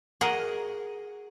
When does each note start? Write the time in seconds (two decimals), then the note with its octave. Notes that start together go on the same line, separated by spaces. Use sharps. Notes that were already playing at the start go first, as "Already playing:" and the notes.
0.21 F#4 G#4 A#4 D#5 F#5